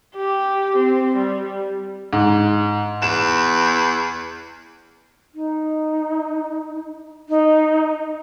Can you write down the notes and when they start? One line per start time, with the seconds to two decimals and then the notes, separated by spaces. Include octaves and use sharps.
0.16 G4
0.77 C4
1.16 G3
2.13 G#2
3.02 E2 E7
5.33 D#4
7.29 D#4